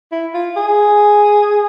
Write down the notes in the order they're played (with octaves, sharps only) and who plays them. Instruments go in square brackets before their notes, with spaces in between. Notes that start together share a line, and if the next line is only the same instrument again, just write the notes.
[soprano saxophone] E4
F4
G#4